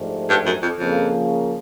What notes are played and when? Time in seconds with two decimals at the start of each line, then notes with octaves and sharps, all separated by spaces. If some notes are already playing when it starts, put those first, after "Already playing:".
Already playing: G#2 F3 A3 D4 G4
0.29 G2
0.46 F#2
0.62 F2
0.78 F2 C#3 F3 A#3